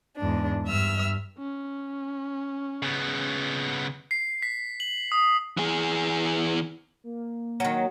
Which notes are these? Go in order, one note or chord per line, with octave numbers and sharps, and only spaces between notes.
E2 G#2 D4
G2 E5 E6 F6
C#4
C#3 B3
C7
B6
F#7
D#6
E3 G#4
A#3
D#3 F#3